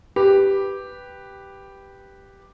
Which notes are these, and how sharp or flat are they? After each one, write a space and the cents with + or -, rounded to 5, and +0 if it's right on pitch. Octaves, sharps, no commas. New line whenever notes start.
G4 +0 B4 +0